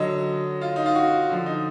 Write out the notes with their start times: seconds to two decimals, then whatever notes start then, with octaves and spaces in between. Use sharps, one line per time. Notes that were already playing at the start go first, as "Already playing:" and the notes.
Already playing: D3 F#3 D#5
0.61 F4
0.76 D#4
0.86 F4
0.95 F#4
1.30 D3 F3
1.46 D#4